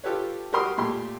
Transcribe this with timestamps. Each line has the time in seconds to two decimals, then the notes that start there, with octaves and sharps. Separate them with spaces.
0.04 F4 G4 A4 B4 C#5
0.53 F#4 G4 A#4 C6 D#6
0.78 A#2 A3 G4 C6